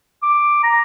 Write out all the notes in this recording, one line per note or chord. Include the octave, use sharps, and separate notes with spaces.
D6
A#5